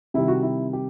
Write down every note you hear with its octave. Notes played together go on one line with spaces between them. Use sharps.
C3 D#3 G3 E4
F#4
E4
G4